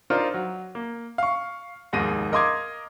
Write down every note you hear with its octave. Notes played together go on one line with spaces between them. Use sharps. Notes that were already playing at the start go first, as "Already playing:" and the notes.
D4 D#4 F4 A#4 C5
F#3
A#3
F5 C#6
F1 D#2 G#2 G#4 A#6 D#7
A#4 D#5 F5 C6 D6 G#6